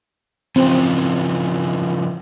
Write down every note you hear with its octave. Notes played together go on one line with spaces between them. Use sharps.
C#3 E3 F3 C4